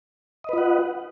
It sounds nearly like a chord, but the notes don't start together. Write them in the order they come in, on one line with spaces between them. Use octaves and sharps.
D#5 B4 F4 F#5